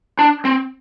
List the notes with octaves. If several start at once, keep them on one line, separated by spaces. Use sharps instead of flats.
D4
C4